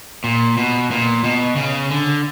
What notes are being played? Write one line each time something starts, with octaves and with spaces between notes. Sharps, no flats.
A#2
B2
A#2
B2
C#3
D3